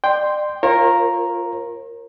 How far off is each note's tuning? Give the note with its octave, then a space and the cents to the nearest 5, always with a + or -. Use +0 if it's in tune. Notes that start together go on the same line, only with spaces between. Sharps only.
D5 +40 G5 +0 C6 +0
F4 +0 A#4 +0 C#5 -45